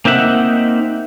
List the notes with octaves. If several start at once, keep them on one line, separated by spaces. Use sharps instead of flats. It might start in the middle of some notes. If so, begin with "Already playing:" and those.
A#3 C4 D#4 E5 F#5